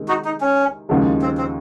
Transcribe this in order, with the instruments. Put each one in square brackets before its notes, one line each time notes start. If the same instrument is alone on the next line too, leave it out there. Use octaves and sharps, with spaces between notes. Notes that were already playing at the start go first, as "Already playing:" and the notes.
Already playing: [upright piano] C3 D#3 G#3
[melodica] D#4 F#4
D#4
C#4
[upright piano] D#2 C#3 F3 G#3
[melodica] C4
C4